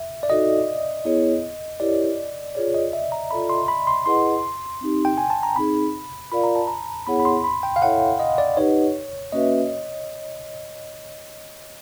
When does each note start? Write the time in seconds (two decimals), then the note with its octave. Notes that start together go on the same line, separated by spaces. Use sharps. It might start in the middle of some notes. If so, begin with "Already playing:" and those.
Already playing: E5
0.23 D5
0.30 D#4 F#4 A4 D#5
1.05 B3 E4 G#4 C#5
1.80 E4 G4 A#4 C#5 D5
2.55 F4 G#4 C#5 D5
2.74 D#5
2.93 E5
3.12 A#5
3.31 F4 A4 D5 B5
3.49 C6
3.68 B5
3.87 C6
4.06 E4 G#4 B4 D#5 F#5 C6
4.81 C4 D#4 G4
5.05 G5
5.18 G#5
5.30 A5
5.43 A#5
5.56 C4 D#4 G#4 B5
6.32 F4 A#4 D5 F5 B5
6.44 A#5
6.56 A5
6.68 A#5
7.07 B3 E4 G#4 C#5 F#5 B5
7.20 B5
7.25 C6
7.44 B5
7.63 G5
7.76 F5
7.82 E4 A4 C#5 E5 F#5
8.20 D#5
8.38 D5
8.57 D#4 G4 B4 C#5 D#5 F#5
9.32 A#3 C#4 F#4 B4 D#5 E5